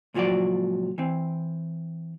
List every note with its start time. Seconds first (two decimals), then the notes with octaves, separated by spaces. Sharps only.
0.14 C#2 A#2 F3 F#3 F#4 D5
0.98 E3 C4